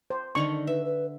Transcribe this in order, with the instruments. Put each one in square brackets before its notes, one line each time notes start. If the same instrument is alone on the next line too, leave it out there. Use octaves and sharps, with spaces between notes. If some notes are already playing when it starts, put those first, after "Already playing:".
[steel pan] C5
[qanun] D3 D#3 D#4 [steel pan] D4 C#6
[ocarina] B4 [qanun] E5
[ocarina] B4